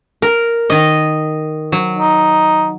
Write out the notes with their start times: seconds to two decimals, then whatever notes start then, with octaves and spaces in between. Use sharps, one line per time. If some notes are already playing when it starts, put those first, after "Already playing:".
0.22 A#4
0.70 D#3 D#5
1.72 F#3
1.98 D#4